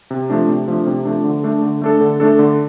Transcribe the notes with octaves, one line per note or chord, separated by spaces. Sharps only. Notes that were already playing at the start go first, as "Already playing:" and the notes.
C3
F3 A3 D4
C3
F3 A3 D4
C3
F3 A3 D4
D3
A3 D4 A4
D3
A3 D4 A4
D3
A3 D4 A4
D3